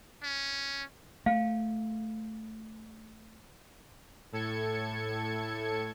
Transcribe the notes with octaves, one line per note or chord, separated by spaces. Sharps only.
C#4
A3 F5
A2 A4 G#6 C#7